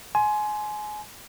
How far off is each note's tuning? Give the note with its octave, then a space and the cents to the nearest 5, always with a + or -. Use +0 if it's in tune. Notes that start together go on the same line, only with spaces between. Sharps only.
G#5 +25 C6 +0